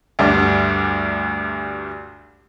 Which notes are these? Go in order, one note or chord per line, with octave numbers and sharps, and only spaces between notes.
D2 G2 D4